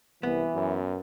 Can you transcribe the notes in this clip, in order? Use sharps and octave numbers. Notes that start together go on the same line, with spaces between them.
C2 E3 B3
F#2